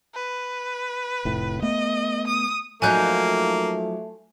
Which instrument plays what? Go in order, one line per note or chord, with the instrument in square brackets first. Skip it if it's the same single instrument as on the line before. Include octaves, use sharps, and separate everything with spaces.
[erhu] B4
[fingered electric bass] F1 A2
[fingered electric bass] A3 B3 [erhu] D#5
[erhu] D#6
[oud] F3 F#3 D#4 [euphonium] A3 [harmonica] A#3 [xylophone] G#5 F#6 G6